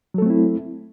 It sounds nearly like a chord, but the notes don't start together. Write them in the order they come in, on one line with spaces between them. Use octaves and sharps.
F#3 A4 A3 C4 E4